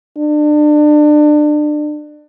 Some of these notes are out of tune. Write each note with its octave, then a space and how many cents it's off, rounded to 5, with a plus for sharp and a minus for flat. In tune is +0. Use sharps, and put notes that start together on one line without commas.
D4 +30